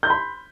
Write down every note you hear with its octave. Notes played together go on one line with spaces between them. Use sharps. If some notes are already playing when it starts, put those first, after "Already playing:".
B5 C6 G6